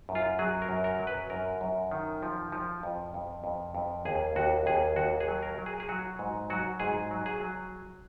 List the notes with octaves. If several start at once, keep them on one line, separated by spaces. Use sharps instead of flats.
F#2
F4
F#3 G#4
A#4
F#2
A#4
F#3
B4
F#2 A#4
F#2
D#3
F3
F3
F2
F2
F2
F2
D#2 G#4
D#2 F#4
D#2 G#4
D#2 F#4
G#4
F#3
A#4
F#3
G#4
G#4
F#3 F#4
G#2
F#3 F#4
G#2 G#4
F#3
G#4
F#3